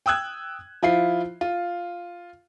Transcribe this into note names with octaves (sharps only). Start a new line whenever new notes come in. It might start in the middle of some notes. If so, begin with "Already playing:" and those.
G5 D#6 E6 F#6 G#6
F3 E4 F4 C7
F4